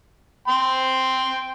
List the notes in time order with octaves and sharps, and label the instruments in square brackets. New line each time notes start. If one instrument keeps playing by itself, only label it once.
[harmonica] G5 C6